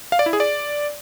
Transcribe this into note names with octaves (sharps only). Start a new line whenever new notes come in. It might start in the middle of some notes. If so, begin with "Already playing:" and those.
F5
D5
E4
G#4
D5